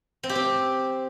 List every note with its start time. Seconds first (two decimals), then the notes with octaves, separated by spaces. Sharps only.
0.23 C4
0.29 G4
0.35 C4